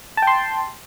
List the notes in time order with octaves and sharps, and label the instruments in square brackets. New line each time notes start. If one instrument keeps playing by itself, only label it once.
[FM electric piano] A5
G5
C6